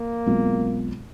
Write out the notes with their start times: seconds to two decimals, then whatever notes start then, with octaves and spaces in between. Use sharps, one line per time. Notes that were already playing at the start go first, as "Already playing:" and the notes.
Already playing: A#3
0.26 B1 B2 G#3 C4 F4